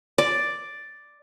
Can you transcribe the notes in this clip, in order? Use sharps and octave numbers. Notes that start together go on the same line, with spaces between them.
D5